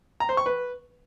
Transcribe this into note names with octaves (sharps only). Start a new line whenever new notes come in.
A#5
C5
C#6
B4